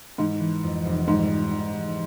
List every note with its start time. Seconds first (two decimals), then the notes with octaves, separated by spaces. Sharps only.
0.18 G#2 E3
0.40 E3
0.63 F2
0.85 F1
1.07 G#2 G3
1.30 F1
1.52 E3
1.74 F1